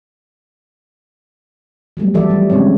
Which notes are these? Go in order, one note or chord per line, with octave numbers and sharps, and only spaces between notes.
F#3 G3 A3 B3
E3 F3 F#4 A4 D5 E5
F3 G3
C#3 G#3 C4 C#5